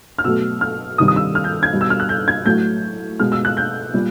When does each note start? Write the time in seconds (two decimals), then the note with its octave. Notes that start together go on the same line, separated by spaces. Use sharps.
0.18 F6
0.24 B2 F#3 A3 E6
0.61 F6
0.98 C3 D#3 G3 D#6
1.08 D#6
1.16 E6
1.35 F6
1.44 G6
1.63 G#6
1.72 B2 G3
1.81 E6
1.90 F6
2.00 F#6
2.09 G6
2.28 G#6
2.46 A2 F#3 A3 G6
3.20 B2 G#3 F6
3.32 E6
3.45 F#6
3.57 G6
3.94 A#2 G3